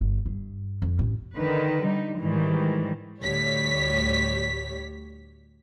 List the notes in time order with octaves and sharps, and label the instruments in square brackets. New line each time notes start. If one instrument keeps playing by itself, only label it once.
[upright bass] G1
G2
F2
A1
[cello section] D3 D#3 B4
G3 D#4
G#2 D#3 E3 G3
[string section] D2 A2 G3 C#5 B6